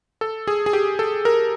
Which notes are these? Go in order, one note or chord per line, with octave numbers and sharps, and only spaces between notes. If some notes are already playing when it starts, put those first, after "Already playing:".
A4
G#4
G#4
G4
A4
A#4